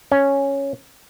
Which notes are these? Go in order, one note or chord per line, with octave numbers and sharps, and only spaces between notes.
C#4